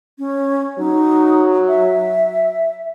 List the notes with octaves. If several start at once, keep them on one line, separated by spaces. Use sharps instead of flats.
C#4
F#3 D#4
E5